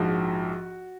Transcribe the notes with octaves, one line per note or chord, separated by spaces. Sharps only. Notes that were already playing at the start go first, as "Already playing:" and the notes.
Already playing: A#1 G#2 F3 F#4